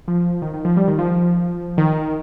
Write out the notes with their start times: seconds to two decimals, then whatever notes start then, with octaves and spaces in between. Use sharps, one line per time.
0.08 F3
0.42 D#3
0.54 D#3
0.65 F3
0.77 G3
0.88 D#3
0.99 F3
1.78 D#3